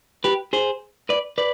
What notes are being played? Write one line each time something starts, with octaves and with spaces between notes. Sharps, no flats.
G4 B4
G#4 C5
B4 D5
B4 D5